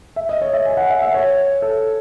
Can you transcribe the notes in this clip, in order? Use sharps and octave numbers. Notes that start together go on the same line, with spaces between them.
E5
D#5
C#5
E5
G#5
F#5
E5
E5
C#5
A4